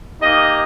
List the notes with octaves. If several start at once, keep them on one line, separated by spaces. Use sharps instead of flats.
A#3 D#4 G4 D#5